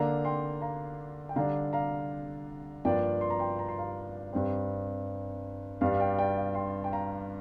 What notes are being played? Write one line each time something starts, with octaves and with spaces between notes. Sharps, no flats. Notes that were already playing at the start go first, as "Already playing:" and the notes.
Already playing: D3 A#3 D4 F5 A#5
G5 C6
F5 A#5
G5
D3 G3 D4 F5 A#5
F5 A#5
G2 F3 A#3 D4 D5 G5
C6
A#5
G5 C6
A#5
C6
F5 A#5
G2 G3 C4
G2 G3 D4 F5
F5
D5 G5
D5 G5
F5
G5 C6
G5
F5 A#5